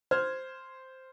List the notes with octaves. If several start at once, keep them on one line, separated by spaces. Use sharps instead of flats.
C5 F6 G#6